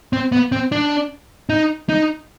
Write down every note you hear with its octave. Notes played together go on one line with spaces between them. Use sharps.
C4
B3
C4
D4
D#4
D#4